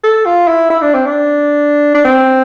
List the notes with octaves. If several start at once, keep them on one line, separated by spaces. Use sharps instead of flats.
A4
F4
E4
E4
D4
C4
D4
D4
C4